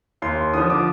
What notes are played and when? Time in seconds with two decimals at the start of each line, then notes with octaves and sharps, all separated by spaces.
0.22 D#2 C6
0.54 D3 F3 D#6
0.70 D6